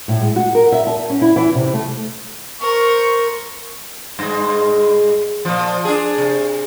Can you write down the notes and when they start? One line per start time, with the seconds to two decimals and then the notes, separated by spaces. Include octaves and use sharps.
0.08 A2
0.22 G#3
0.36 F#4
0.55 A#4
0.72 E5
0.87 A5
1.10 C#4
1.22 E4
1.36 E3
1.55 C3
1.74 A3
2.61 A#4 C5 C#6
4.19 G2 G#3
5.45 A#2 F3
5.85 D4 G#4
6.18 C3